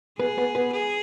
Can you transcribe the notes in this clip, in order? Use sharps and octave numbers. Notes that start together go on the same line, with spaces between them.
B3 G#4 B4
B3 B4
B3 B4
G#4